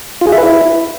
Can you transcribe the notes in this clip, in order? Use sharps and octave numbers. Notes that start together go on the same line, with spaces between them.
F4
G#4
E5
B4
E4